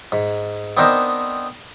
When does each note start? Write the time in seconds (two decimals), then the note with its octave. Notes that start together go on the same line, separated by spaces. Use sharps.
0.12 G#2
0.77 B3 C4 D4 D#4 A#4 C5